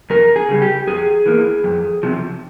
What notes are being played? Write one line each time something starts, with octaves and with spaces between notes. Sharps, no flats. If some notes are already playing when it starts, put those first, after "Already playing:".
F2 A#4
G#4
C#3 G3
G4
F2 G#4
E3 A#3
F2
C3 F3